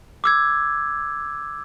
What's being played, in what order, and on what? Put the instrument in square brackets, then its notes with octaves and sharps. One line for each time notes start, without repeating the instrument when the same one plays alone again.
[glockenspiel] D6 E6 G#6